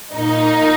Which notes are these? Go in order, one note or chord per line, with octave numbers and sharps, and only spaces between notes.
A#2 A#3 D#4